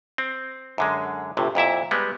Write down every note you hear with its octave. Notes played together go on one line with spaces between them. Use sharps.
C4
F#2 D3 G#3
G1 A2 C3
F2 A#2 E4 E5
G3 G#3 B3